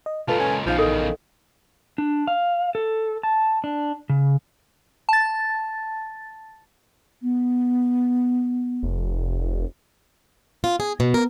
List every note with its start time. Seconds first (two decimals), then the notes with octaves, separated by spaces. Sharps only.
0.06 D#5
0.28 C#2 A#2 F4 A4 B4 A5
0.40 C#4
0.66 A#1 E2 C#3 F3 D#4 F5
0.79 D#3 A4
1.98 D4
2.27 F5
2.75 A4
3.23 A5
3.64 D4
4.09 C#3
5.09 A5 A6
7.22 B3
8.83 F1
10.64 F4
10.80 G#4
11.00 B2
11.14 A#4